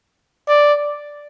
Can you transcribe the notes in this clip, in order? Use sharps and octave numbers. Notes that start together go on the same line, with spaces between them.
D5